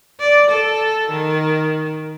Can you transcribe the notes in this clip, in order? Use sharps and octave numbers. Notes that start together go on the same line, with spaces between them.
D5
A4
D#3